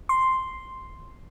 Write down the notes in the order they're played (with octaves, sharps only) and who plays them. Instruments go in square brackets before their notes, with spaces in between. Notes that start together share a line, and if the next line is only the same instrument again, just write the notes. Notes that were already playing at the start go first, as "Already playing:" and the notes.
[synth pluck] C6